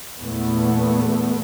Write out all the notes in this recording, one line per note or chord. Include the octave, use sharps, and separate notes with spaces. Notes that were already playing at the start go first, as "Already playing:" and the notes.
E2 A#2 A3 B3